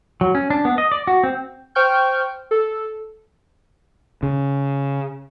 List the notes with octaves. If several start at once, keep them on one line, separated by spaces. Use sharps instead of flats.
F#3
C#4
D4
B3
D#5
D5
F#4
C4
C5 G5 C#6 F6 G6
A4
C#3